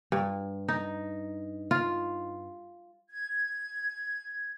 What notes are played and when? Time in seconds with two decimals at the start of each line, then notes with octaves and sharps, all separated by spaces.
0.12 G2
0.68 D#4
1.71 F4
3.11 G#6